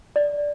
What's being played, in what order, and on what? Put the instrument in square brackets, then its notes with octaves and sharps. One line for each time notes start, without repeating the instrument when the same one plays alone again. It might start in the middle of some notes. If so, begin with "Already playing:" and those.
[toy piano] D5